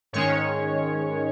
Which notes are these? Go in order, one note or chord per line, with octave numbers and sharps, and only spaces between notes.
G#2 D#3 G#3 C#4 C#5